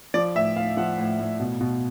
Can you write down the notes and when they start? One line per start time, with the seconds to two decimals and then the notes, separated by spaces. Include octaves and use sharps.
0.14 F3 D5
0.35 A2 E5
0.56 A2 F5
0.77 F3 F#5
0.98 A2
1.19 A2
1.40 B2
1.60 B2